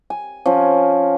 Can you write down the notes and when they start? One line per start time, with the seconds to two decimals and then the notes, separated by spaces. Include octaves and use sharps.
0.10 G#5
0.46 F3 C#4